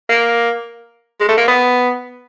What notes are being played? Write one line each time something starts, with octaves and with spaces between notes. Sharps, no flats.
A#3
G#3
A3
A#3
B3